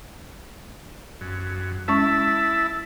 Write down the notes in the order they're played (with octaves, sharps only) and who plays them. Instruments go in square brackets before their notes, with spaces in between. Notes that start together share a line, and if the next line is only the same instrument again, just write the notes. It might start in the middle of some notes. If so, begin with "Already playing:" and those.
[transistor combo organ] F#2
[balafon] G#3 C#4 C#6 [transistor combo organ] E4 E5 A5